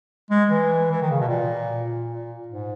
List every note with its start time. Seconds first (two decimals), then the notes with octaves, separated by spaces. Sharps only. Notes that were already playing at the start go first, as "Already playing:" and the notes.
0.30 G#3
0.50 E3
0.91 E3
1.02 D#3
1.11 C#3
1.20 B2
1.29 A#2
2.08 A#2
2.48 G#2